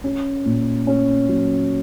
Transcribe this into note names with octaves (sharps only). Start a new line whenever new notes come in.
C#4
A#2
C#4
F#3